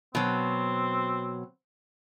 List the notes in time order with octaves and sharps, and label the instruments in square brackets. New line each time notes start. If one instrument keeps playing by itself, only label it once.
[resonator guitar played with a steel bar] B2 F#3 [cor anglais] C4